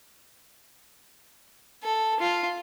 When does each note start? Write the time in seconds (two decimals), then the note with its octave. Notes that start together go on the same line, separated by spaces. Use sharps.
1.83 A4
2.20 F4